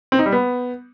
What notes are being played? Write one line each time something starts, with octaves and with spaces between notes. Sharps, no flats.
C4
D#4
G3
B3